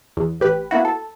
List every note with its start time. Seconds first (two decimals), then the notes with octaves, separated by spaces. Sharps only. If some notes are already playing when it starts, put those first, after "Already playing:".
0.17 E2
0.40 A1 G4 B4
0.71 A#3 B3 E4 F#4
0.85 A4